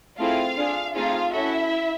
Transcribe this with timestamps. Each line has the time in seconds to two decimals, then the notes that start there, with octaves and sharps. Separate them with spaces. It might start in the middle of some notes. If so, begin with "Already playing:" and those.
0.18 A3 C4 E4 F4 G#4 F5
0.56 D4 F4 G#4
0.94 A3 C4 D#4 F4 G#4 F5
1.32 C#4 E4 F#4 A4 E5